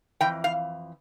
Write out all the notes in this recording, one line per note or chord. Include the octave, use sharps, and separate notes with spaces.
F2 E3 G5
F5